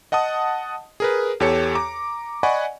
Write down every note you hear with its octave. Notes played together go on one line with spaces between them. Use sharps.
D#5 F#5 A5 D#6
G#4 A#4 B4
E2 G4 A4 C#5 C#7
A#5 D6
D5 D#5 F#5 G#5 B5 C#6